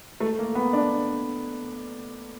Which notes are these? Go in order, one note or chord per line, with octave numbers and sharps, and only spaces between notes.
A3
A#3
B3
D4